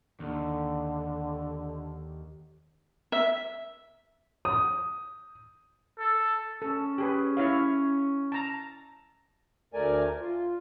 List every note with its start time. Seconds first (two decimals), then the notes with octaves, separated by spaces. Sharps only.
0.20 D#2 D3
3.12 E5
4.45 D#6
5.99 A4
6.62 C#4 A4
6.98 G4 G#4 B4
7.37 E4 C#5 F5
8.32 A5 A#5
9.74 D2 A3 A#4 D5 G#5
10.21 F4